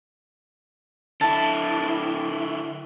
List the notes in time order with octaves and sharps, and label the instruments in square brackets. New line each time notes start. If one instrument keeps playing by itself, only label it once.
[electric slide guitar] D3 E4 [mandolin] A5